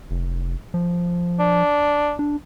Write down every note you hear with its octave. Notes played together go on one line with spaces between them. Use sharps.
F1
F3
D4
D4